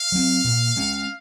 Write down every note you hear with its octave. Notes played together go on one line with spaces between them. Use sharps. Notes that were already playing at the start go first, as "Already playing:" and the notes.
Already playing: F5
F#3 C4
A#2
G#3 C#4